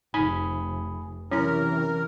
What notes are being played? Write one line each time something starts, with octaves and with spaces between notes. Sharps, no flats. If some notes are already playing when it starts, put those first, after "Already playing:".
F1 D#4 G#5 B5 D#6
C3 E3 F#3 C#4 E4 A#4 A#5